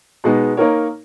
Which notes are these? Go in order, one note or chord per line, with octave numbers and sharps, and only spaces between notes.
B2 G#3 B3 D#4
A#3 D#4 A#4 C#5